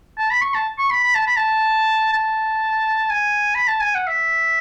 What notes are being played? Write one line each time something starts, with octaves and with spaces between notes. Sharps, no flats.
A5
B5
C#6
A5
C#6
B5
B5
A5
B5
A5
A5
G#5
B5
A5
G#5
F#5
E5